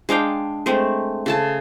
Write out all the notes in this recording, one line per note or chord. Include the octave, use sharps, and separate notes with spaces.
G#3 D4 F5 G5
G#3 A3 C4
C#3 A4 A5